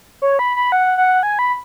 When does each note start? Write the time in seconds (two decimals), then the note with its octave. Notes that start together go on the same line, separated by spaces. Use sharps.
0.22 C#5
0.39 B5
0.56 B5
0.72 F#5
0.98 F#5
1.23 G#5
1.39 B5